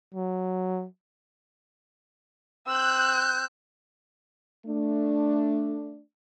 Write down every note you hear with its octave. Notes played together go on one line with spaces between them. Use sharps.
F#3
C4 E6 F#6 G6
A3 D4